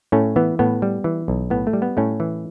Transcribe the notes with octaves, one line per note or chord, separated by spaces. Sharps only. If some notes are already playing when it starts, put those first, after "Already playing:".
A2 A3 C#4
E3 B3
A2 B3
G3
E3
B1
A2 B3
A3
G3
B3
A2 A3 C#4
E3